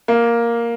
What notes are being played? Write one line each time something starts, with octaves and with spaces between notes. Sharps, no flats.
A#3